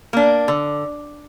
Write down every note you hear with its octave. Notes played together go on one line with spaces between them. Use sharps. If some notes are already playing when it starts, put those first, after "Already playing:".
A#3 D4
D3